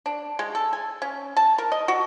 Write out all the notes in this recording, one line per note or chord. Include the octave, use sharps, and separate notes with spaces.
D4
G#3
A4
G#5
C#4
A5
A#4
D#5
F#4